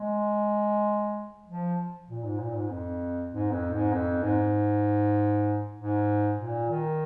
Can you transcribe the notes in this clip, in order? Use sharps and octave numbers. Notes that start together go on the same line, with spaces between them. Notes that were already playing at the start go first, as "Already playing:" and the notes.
Already playing: G#3
F3
A#2
G#2
A#2
G#2
F2
G#2
F2
G#2
F2
G#2
G#2
A#2
D#3